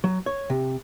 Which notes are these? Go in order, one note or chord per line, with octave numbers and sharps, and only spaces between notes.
F#3
C#5
C3